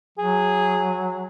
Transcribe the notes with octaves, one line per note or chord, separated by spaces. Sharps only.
F#3 G#4